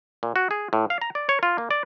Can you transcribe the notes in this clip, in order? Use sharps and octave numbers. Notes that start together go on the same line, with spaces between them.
A#2
F#4
G#4
A2
F5
A#5
D5
C#5
F4
A#3
D5